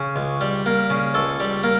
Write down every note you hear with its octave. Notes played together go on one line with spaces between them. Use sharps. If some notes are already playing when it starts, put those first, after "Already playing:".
Already playing: C#3
C#2
G3
A#3
C#3
C#2 A4
G3
A#3